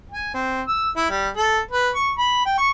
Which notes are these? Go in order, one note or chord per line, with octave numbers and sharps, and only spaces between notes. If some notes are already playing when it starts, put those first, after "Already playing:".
G#5
C4
E6
E4
G3
A4
B4
C#6
B5
G5
C#6